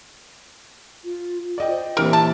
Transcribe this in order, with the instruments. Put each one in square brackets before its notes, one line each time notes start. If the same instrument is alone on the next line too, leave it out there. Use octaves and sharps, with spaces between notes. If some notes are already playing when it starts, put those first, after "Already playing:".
[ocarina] F4
[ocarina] F4 [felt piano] D5 D#5 G5
[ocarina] C5
[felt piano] A#2 E3 G4 [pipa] A#4
[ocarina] E5 [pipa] A5